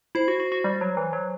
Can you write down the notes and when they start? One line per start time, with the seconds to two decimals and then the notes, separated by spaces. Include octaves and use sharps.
0.15 E4 C5
0.28 F#4
0.40 F#4
0.52 F#4
0.64 G3
0.81 F#3
0.97 E3
1.13 F#3